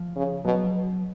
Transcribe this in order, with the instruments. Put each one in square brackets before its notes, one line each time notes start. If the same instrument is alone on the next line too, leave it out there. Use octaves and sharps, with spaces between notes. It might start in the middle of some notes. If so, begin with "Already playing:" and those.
Already playing: [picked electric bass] F3
[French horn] C#3
[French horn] B2 [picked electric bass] F#3